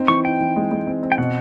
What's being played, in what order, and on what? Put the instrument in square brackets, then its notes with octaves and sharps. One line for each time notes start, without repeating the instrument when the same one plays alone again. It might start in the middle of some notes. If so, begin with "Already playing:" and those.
Already playing: [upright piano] C4 D#4
[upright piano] E3 [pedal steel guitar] C#6
[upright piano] D#4 [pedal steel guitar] G5
[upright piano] E3
G#3
G#3
C4
C4
[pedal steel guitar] G5
[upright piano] B2 [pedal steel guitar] F#5